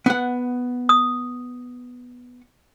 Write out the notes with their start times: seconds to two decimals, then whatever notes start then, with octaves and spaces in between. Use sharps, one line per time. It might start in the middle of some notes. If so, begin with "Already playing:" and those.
0.06 B3 F#5
0.89 D#6